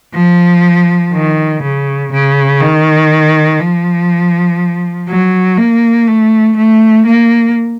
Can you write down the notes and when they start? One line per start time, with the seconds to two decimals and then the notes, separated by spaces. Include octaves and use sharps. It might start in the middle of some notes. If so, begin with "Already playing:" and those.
0.14 F3
1.13 D#3
1.63 C#3
2.12 C#3
2.60 D#3
3.60 F3
5.08 F#3
5.57 A#3
6.07 A3
6.57 A3
7.06 A#3